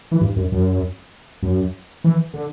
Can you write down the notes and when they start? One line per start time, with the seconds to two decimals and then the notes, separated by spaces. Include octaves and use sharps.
0.11 E3
0.21 G2
0.36 F#2
0.52 F#2
1.42 F#2
2.04 E3
2.33 D3